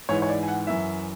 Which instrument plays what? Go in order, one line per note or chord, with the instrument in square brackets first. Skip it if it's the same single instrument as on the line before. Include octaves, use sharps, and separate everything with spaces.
[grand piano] G#2 E3 C#5
C#5
D5
G#5
F#5
F#2 E3 E5